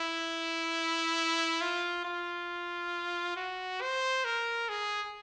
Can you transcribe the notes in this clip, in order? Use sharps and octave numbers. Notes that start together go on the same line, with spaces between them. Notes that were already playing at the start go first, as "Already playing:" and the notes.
Already playing: E4
F4
F4
F#4
C5
A#4
G#4